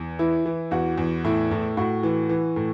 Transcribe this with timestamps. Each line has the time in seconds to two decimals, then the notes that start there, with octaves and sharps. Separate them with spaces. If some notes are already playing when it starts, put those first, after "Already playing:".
Already playing: E2
0.19 E3 E4
0.46 E3
0.71 E2 F#4
0.98 E2
1.24 A2 E4
1.51 A2
1.77 A2 F#4
2.03 E3
2.29 E3
2.56 A2